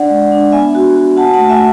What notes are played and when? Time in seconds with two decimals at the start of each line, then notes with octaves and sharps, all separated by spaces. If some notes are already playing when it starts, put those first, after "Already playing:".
Already playing: D4 D5 F#5
0.10 G#3
0.32 D4
0.52 B3 E5 G#5
0.75 F#4
0.95 F#4
1.17 F#4 F#5 A5
1.34 A3 F#5 A5
1.49 E5 G#5